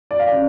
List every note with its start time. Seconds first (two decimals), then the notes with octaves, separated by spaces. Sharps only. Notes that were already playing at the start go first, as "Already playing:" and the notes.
0.11 D5
0.19 F5
0.27 C#3 D5